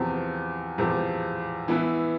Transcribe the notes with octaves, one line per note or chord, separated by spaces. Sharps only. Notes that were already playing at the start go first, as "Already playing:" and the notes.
Already playing: E2 C3 F3 C4 G4
E2 C3 F3 C4 G4
E3 B3 E4